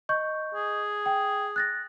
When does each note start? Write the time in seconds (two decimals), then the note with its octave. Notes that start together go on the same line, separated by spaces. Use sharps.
0.09 D#5 C#6 G6
0.55 G#4
1.06 G5
1.56 F#6 A6 A#6